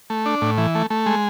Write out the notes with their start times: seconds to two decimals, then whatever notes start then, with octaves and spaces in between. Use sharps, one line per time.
0.10 A3
0.26 D4
0.42 A2
0.58 E3
0.75 A3
0.90 A3
1.06 G#3